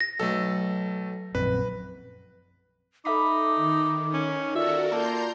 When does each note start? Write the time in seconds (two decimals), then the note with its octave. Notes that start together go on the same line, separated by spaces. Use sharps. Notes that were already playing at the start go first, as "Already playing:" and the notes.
0.01 A#6
0.20 B1 A3 A4
1.35 A#1 F#2 C4 B4
3.05 D#4 A4 E5 B5 D6
3.56 D#3
4.13 C#4
4.55 F4 F#4 A4 A#4 D5 E5
4.92 A#3 A5 A#5 C6 G6